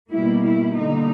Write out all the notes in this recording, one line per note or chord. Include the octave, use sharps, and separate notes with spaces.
B2 G3 A#3 E4
E4
D3 G3 A#3 D#4